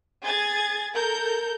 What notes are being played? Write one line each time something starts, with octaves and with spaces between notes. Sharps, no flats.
G#4 G#6 A6
A4 A#4 G6